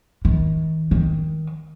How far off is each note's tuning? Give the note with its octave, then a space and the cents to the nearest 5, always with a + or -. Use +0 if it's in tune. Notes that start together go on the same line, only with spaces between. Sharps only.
D#3 +40
D#3 +20